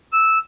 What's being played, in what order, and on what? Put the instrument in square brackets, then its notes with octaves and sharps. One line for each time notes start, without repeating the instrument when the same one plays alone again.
[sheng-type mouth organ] E6